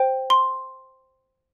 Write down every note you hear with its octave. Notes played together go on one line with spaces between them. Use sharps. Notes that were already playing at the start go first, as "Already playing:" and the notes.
Already playing: C5 G5
C6